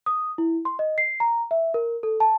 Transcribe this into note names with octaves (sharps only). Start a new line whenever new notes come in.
D#6
E4
C6
D#5
C7
A#5
E5
A#4
A4
A5